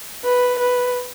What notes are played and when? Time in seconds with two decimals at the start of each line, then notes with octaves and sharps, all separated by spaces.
0.25 B4
0.59 B4